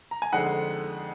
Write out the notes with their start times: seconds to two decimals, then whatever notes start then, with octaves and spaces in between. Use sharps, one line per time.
0.11 A#5
0.22 G#5
0.32 F2 D3 G#3 D#4 F#5